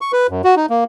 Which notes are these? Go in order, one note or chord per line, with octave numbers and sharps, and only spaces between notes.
C#6
B4
F#2
F#4
D#4
A#3